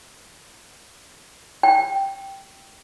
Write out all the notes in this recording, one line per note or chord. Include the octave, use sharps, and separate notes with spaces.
G5